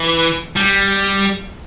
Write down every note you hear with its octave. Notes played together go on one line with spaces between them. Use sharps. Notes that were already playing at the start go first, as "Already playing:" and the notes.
Already playing: E3
G3